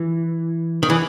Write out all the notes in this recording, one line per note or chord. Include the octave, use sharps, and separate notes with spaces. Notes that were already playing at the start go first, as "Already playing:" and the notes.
Already playing: E3
D#3
E3